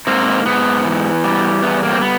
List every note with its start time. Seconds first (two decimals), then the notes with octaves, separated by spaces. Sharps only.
0.07 G#2 A#3 C4
0.46 G#2 B3
0.85 E3
1.24 G3
1.62 E2 B3
1.83 A#3
1.92 C4
2.02 B3